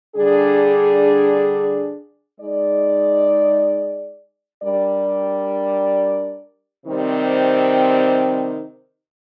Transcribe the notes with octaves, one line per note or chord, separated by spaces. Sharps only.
D3 G3 D4 G#4
G#3 D#4 G#4 D5
G3 D4 G4 A#4 D5
C3 D#3 G3 C4